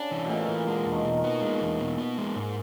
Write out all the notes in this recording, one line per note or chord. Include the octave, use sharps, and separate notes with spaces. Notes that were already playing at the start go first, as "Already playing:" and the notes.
Already playing: C#3 D4
E3
B2
A#2 A3
E3
D3 G#3
E2
D#3
B2
D#3
B3
G#3
E2
B2
B3
G#3
G#2